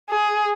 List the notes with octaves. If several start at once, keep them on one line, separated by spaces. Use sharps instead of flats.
G#4